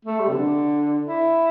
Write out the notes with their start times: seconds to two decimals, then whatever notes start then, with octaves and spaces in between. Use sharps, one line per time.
0.05 A3
0.20 G3
0.29 C3
0.33 D3
1.07 E4